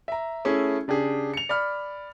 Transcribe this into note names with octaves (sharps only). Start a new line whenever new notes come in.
E5 A#5
A3 C#4 E4 G#4
C#3 D4 G4 G#4
C#7 F7
D5 B5 F6